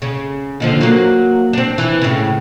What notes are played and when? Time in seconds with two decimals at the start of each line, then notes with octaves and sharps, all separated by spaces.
0.02 C#3
0.60 D#2 D3 F3
0.81 F#3 A#3
1.53 C4 D4
1.78 E3
2.01 A2 C#3